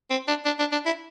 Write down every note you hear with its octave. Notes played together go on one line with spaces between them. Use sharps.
C4
D4
D4
D4
D4
E4